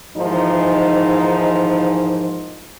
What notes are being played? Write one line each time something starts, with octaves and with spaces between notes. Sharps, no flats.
D#2 G#2 E3 F3 D#4